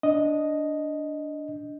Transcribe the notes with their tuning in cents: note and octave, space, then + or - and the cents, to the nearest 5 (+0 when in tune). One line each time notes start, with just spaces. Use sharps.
D4 -5 D#5 +0